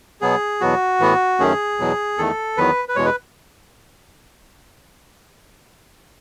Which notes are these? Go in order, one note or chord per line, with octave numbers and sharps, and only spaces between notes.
B2 F#3 B3 G#4
E2 B2 F#3 B3 F#4
A2 E3 B3
F#2 D#3 A3 C#4 G#4
E2 B2 F#3
E2 D#3 A3 A4
E2 D#3 F#3 B3 B4
B4
E2 B2 G#3 C#5
B4